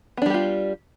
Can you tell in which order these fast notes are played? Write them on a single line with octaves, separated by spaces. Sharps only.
B3 D4 G3 G4 F4